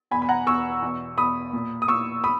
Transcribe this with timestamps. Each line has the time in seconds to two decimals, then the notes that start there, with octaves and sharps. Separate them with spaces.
0.11 E2 B2 G#5 B5
0.22 B5
0.29 F#5 A#5
0.46 E2 B2 C#6 E6
0.82 E2 B2
1.18 E2 B2 B5 D#6
1.53 A#2
1.82 D#6
1.88 A#2 C#6 E6
2.24 B5 D#6